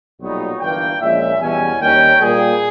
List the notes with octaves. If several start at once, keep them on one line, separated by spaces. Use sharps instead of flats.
B1 A#2 G3 B3 D#4 C#5
G1 G2 E3 A#3 G5
A#1 A#2 G#3 C#4 E5
E2 B2 G3 C#4 G#5
D#2 D#3 G3 C#4 G5
A#2 G3 A#3 G#4